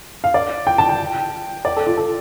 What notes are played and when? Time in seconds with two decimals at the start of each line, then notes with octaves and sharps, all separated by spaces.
0.24 F5
0.34 D5
0.67 G5
0.78 A5
0.89 G5
1.65 D5
1.76 A4
1.87 F4
1.97 A4